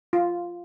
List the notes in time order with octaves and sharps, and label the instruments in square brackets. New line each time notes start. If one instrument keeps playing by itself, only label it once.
[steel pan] F4